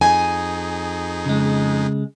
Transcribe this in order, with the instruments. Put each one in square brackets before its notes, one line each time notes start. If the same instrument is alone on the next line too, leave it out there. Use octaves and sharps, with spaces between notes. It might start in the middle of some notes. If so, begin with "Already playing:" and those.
[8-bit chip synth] F2 D#4 G#4 [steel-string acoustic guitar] G#5
[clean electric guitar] C#3 G#3